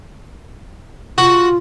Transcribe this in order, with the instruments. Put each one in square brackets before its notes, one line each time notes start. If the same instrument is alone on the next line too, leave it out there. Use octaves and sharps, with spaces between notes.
[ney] F4 [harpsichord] F#4